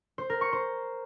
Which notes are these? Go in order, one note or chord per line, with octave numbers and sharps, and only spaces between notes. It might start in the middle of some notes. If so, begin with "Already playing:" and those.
C5
A#4
C#6
C5